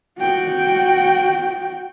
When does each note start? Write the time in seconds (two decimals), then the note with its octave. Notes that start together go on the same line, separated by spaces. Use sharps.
0.19 F#4 G5